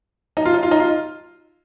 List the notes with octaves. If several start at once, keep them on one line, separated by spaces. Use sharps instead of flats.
D#4
F4
D#4
F4
D#4
F4